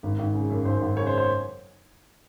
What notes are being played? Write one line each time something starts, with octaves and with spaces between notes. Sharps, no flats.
G#1
G#1
C#3
F#2
G#1 C5
G#1
C#3 C#5
C5
C5